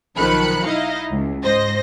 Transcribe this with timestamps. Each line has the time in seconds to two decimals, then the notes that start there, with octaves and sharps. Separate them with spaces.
0.16 B1 D#3 F3 B5 F#6 C#7
0.65 D#4 E4 D#5 F5
1.10 C#2
1.44 G#2 C5 D#5 A#6